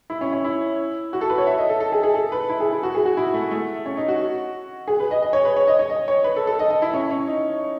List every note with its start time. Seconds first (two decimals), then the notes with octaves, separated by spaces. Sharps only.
0.10 E4
0.21 C#4
0.33 C#4
0.44 E4
1.13 F#4
1.21 A4
1.30 B4
1.38 C#5
1.47 E5
1.58 D#5
1.69 A4
1.80 A4
1.92 G#4
2.03 G#4
2.15 A4
2.32 B4
2.49 E4
2.60 G#4
2.72 E4
2.83 F#4
2.95 G#4
3.06 F#4
3.17 E4
3.34 A3
3.51 A3
3.86 C#4
3.97 D#4
4.08 F#4
4.88 G#4
5.00 B4
5.11 D#5
5.23 D#5
5.33 C#5
5.45 B4
5.56 C#5
5.67 D#5
5.79 C#5
5.90 D#5
6.08 C#5
6.24 B4
6.36 A4
6.47 A4
6.59 D#5
6.70 D#5
6.82 E4
6.93 C#4
7.10 C#4
7.27 D#4